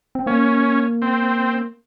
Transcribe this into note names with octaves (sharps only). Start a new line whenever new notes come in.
C4
A#3 C#4
C4